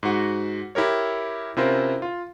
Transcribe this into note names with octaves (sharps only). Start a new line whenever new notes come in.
G#2 F#4
E4 G4 A#4 C#5
C3 C#4 E4 F4 A#4 C5
F4